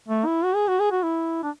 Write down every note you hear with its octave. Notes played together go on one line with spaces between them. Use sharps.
A3
E4
F#4
G#4
F#4
G#4
F#4
E4
D4